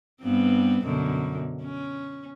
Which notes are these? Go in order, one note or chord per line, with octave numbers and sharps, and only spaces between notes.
G2 B3 C4
F#2 B2 D3
C#4